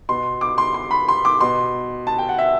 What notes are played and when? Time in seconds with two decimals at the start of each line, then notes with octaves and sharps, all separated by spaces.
0.09 B2 C6
0.41 D6
0.58 C6
0.74 C6
0.91 B5
1.08 C6
1.25 D6
1.41 B2 C6
2.07 A5
2.18 G5
2.29 F#5
2.38 E5